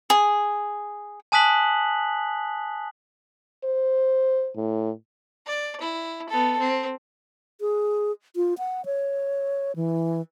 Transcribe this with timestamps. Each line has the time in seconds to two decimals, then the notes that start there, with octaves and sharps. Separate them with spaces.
0.10 G#4
1.32 G#5 A5 D#6 F#6 B6 F#7
3.64 C5
4.57 A2
5.46 D5
5.81 E4
6.29 B3 A4
6.60 C4
7.61 G#4
8.36 F4
8.58 F#5
8.85 C#5
9.76 E3